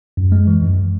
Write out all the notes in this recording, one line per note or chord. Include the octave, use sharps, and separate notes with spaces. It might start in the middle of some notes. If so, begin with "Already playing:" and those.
F#2
G#3
E3
F#2